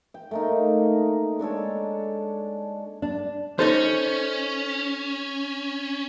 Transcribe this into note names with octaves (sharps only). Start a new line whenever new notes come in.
G5
A3 A#3 D#4
G#3 D4 A4 C#5
D4
C#4 D#4 A4 C5